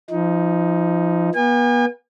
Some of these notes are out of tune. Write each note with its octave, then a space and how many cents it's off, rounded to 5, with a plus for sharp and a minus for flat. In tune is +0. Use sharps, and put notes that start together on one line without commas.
F3 -20 D#4 +15
B3 -35 G#5 -40